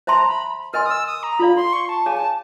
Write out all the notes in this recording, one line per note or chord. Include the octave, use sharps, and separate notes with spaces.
C5 E5 A5 A#5 C6
B5
A#4 D#5 G#5 C6 F6
D#6
E6
D#6
A#5
F4 A4 D5 F5 B5
C6
C#6
A5
G#4 C#5 F5 G#5
A5